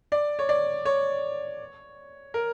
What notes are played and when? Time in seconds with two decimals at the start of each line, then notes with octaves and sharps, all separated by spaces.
0.12 D5
0.39 C#5
0.49 D5
0.85 C#5
2.34 A#4